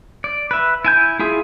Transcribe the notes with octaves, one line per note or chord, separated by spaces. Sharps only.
D5
B4 E5
E4 G#5 G6
E4 F4 G#4 E5